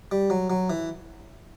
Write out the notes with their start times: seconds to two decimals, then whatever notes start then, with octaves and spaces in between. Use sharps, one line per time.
0.12 G3
0.30 F#3
0.50 F#3
0.70 E3